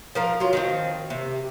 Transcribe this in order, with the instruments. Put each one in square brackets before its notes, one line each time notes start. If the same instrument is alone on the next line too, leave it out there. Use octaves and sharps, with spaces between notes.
[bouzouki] F3 A#4 F5
F#3 F4
D#3 F3 C4
C3